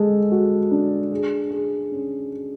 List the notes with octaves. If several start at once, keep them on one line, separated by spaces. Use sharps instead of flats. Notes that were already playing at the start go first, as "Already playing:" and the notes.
Already playing: G#3 A4
F#4
D4
G#4
G#4
C#4